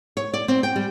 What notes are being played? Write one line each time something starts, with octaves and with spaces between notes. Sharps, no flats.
C#5
D5
C4
G5
G3